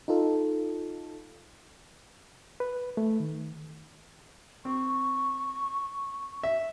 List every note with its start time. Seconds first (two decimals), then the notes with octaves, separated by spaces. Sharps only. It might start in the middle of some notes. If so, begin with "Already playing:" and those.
0.08 D#4 F4 A4
2.60 B4
2.97 A3
3.20 D#3
4.65 C4 C#6
6.43 E5